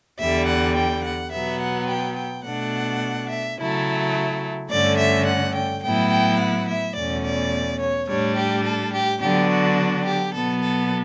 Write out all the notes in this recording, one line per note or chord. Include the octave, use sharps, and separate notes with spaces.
E2 D3 G3 E5
F#5
G5
F#5
B2 F#3 B3 E5
F#5
G5
G5
B2 A3 D4 F#5
E5
C#3 F#3 A3 E4
G2 D3 A3 C#4 D5
E5
F#5
G5
A2 F#3 B3 E4 G5
G5
F#5
E5
E2 B2 A3 C#4 D5
D5
C#5
A2 G3 D4 C#5
G4
A4
G4
D3 F#3 B3 D4 G4
F#4
G4
B2 F#3 B3 A4
A4